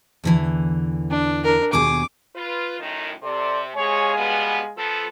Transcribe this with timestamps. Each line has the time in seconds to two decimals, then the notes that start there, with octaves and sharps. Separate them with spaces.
0.24 E2 D3 E3
1.11 D4
1.44 D4 A#4
1.73 D#2 B2 G#4 D6
2.35 F4 B4
2.80 F#2 A2 D#3
3.23 C3 A4 D5 C6
3.76 C3 G#3 G#4 C#5 F5 G#5
4.17 B2 G3 B3
4.76 F3 B3 A4